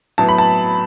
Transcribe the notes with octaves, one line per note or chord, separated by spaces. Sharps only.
A2 F#3 B3 A5
B5
A5